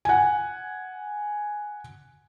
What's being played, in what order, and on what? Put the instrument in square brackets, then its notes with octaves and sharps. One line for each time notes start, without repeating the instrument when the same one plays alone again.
[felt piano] F#5 G#5